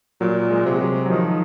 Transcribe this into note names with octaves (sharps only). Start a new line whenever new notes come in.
A#2 F#3
G#3
C3
G#3
F#3
F#3
D#3 F3